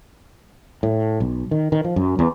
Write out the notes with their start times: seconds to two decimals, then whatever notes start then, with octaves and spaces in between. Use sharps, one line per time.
0.83 A2
1.20 B1
1.51 D#3
1.72 D#3
1.84 F3
1.96 F#2
2.19 E2